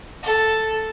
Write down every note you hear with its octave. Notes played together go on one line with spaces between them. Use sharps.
A4